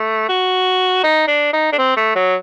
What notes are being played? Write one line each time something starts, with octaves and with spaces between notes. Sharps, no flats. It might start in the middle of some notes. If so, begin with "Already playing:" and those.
Already playing: A3
F#4
D#4
D4
D#4
D4
C4
A3
F#3